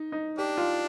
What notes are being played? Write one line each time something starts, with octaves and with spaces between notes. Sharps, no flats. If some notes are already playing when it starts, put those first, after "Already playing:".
Already playing: D#4
D#4
D4 G4
F4